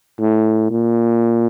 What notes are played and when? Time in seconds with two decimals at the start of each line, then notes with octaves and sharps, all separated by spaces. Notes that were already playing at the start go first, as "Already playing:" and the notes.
0.20 A2
0.71 A#2